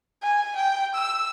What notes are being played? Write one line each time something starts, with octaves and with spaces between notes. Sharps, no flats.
G#5
G5
E6